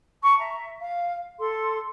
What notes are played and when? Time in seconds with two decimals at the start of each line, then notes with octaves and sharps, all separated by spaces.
0.23 A5 C#6
0.39 E5 A#5
0.80 F5
1.39 A4 C6